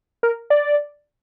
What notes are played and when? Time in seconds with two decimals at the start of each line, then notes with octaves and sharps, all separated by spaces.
0.23 A#4
0.50 D5